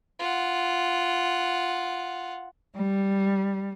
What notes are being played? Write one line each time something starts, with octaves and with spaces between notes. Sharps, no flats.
F4 F#5
G3